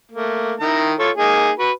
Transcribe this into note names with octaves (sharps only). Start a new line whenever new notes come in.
A3 A#3
D#3 E4 A#5
F4 A4 C#5
A#3 D#4 G#4
F#4 B4